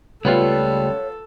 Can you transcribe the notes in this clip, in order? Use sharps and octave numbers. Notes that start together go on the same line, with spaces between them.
C#2 G3 A3 B3 F4 A4 C#5